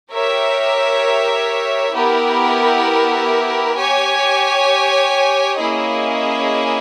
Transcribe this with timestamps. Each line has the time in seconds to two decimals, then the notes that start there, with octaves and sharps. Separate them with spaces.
0.12 G4 A#4 C#5 E5
1.93 B3 E4 G4 A#4
3.75 G4 C#5 G#5
5.58 A#3 C#4 E4 G#4 D#5